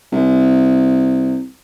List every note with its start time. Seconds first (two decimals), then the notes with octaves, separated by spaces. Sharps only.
0.12 C2